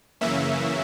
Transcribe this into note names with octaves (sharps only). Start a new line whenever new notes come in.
F#2 C#3 E3 A#3 C#4 E5